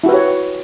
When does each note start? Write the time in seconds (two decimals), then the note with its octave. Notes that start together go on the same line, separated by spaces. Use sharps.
0.04 E4
0.06 F#4
0.09 B4
0.11 G4
0.14 C#5